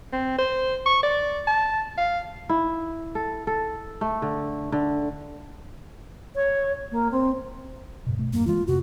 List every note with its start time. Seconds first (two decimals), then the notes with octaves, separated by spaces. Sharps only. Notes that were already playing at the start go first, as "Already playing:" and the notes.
0.13 C4
0.39 C5
0.86 C#6
1.03 D5
1.47 A5
1.98 F5
2.49 E4
3.15 A4
3.47 A4
4.01 A3
4.22 D3
4.72 D3
6.35 C#5
6.91 A#3
7.11 C4
8.06 D2 G2 B2
8.19 B2 A3
8.33 F1 G2 A#3
8.47 E3 G#3 A#3 F4
8.67 F2 C3 F#4